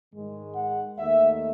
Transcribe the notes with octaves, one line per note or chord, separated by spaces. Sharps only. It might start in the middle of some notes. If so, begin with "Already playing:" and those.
G#2 D#3 G#3
F#5
D#2 D#3 A3 E5